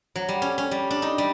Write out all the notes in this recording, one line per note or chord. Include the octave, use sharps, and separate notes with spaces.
F#3
G3
C#4
C#4
G3
D4
D#4
G3